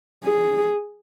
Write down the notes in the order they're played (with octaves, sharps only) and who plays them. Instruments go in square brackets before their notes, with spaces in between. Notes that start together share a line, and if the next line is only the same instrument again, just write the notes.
[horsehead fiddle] G#4